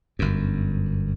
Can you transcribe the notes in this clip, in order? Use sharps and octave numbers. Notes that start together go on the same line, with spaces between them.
G1 F#2